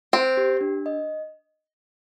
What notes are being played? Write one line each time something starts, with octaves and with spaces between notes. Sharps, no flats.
C4 C5
G4
D4
D#5